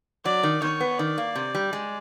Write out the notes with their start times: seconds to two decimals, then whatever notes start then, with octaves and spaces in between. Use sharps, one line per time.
0.25 F#3 D5
0.43 D#3
0.62 D#3 C#5
0.80 B3
0.98 D#3 D5
1.18 A#3
1.36 C3
1.55 G3
1.73 G#3